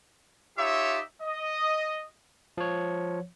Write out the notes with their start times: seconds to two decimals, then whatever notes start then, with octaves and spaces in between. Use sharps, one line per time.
0.58 D#4 F4 G4 C#5 E5
1.23 D#5
2.58 F3 C#5